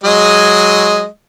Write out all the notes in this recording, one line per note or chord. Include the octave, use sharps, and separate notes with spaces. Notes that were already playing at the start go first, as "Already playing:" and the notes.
F#3 G#3 D#5